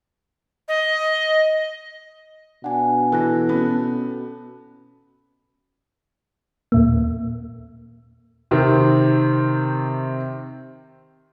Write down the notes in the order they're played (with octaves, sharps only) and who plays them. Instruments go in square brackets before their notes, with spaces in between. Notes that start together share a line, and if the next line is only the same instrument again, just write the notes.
[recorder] D#5
[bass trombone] B2 [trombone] D4 [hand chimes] F#5 G#5
[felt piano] E3 [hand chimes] E4 F#6 A#6 [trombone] A4
[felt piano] B3 [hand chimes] C#4
[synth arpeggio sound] D#2 A#2 A#3
[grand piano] C3 D#3 C4